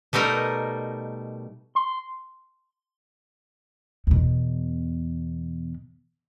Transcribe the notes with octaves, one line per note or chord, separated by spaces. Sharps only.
B2 G3 A3 D#4 A#4
C6
E2 B2